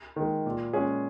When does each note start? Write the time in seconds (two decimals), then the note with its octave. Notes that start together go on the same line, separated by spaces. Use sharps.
0.16 D#3 G#3
0.46 A#2
0.73 G#3 C#4 G#4